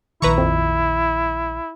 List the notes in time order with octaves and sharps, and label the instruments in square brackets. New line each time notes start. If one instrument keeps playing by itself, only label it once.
[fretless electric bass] A#1 D#3 [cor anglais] E4 [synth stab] B4 A#5 C#6
[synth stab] F2